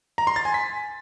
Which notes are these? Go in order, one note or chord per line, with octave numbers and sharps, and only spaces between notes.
A#5
C6
A6
G#5
B6